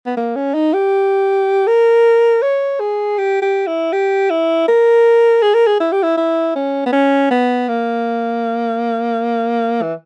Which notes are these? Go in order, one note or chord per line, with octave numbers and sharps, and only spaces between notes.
B3
A#3
C#4
D#4
G4
A#4
C#5
G#4
G4
G4
E4
G4
E4
A#4
G#4
A#4
G#4
E4
G4
E4
E4
C#4
B3
C#4
B3
A#3
E3